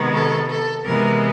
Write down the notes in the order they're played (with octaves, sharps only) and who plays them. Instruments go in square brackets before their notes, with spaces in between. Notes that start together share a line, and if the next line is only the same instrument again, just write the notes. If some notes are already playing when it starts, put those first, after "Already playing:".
Already playing: [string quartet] C3 D#3 G#3 B3
A4
A4
C3 E3 G#3 B3 D#4 A#4